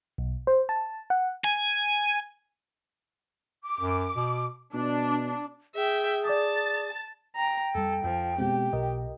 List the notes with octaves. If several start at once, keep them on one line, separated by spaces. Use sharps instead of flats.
B1
C5
A5
F#5
G#5
D6
F#2
B2
B2 D4
G#4 E5 G5
D5 A5 D6 D#6 A6
G5 A#5
F2 G3 A4
F2 F3
B2 G#3 C4 G4
B1 B2 A#4 D#5